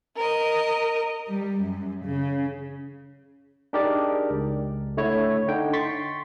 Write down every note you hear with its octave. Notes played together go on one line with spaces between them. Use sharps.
A#4 D#5
G3
F#2
C#3
D4 D#4 G4 G#4 A#4 D5
C#2
D3 A3 E4 C#5
D3 D#4 G5
C6 C#6 A6 B6